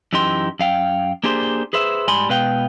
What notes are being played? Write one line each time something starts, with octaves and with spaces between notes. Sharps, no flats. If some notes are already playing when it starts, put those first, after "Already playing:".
F#2 E3 D#4 G4 C6
F#2 F5 G5
A#3 D4 G4 G#4 C5
G#4 B4 C5 E5
G#2 G3 G#5 B5 C6
B2 G#3 B4 F5 G5